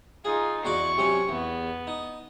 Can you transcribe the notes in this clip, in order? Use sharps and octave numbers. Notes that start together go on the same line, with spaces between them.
D#4 F4 G#4
E2 F#4 D5 C#6
C3 F#3 C#4
E2 B3
D#4